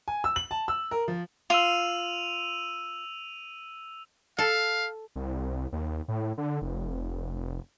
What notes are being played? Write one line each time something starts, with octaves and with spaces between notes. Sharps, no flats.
G#5
E6
F#7
A5
E6
A#4
F3
F4 E6 D#7 F7
A4 F5
C2
D#2
A2
D3
F1